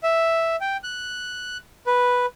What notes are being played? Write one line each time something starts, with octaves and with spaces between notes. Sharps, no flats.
E5
G5
F#6
B4